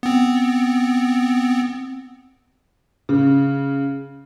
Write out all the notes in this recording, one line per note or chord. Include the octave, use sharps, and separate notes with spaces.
B3 C4
C#3